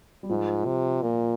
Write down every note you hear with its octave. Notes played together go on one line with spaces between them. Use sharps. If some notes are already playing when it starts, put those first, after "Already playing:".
G3
G#2 F3
C3
A#2 A#3